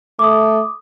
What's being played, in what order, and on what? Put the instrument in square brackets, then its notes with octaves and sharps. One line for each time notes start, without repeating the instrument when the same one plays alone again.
[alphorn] A3 [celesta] D6 D#6